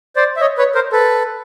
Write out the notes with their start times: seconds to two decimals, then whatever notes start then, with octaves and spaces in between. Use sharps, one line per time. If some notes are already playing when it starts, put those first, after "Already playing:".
0.16 C5 D5
0.36 E5
0.41 C#5 D#5
0.58 B4 C#5
0.75 A#4 C5
0.92 A4 B4